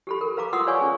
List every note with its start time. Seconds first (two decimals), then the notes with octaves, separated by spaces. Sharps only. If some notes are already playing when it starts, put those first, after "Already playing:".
0.07 G4 A4 B5
0.21 A4 A#4
0.37 B4 F5 A#5 D6
0.53 F4 F#5 C6 D#6 E6
0.67 B4 C#5 D5 F5 G#5 C#6
0.80 C#4 G#4